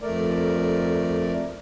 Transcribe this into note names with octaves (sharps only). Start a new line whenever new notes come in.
F2 A3 A#4 D5